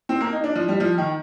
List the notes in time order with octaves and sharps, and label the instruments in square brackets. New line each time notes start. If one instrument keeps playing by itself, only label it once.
[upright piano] C4
A#3
D#4
D4
F3
G3
F3
D#3